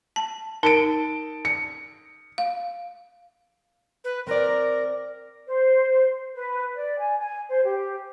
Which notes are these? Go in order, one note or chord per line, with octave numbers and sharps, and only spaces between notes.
A5
D#4 A#4 A5 C#7 D7
C#7
F5
B4
C4 A#4 D5
C5
B4
D5
G#5
G#5
C5
G4